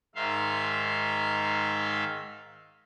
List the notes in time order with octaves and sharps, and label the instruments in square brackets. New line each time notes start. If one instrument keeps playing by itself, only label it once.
[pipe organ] G#2 D#3 E5 F5 C6